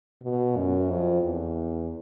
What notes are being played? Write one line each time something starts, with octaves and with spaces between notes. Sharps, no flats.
B2
F#2
F2
E2